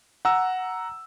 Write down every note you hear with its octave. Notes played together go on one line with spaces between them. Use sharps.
F#5 A#5 E6